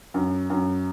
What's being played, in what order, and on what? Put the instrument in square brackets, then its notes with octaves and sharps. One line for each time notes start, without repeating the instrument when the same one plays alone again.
[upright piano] F#2
F#2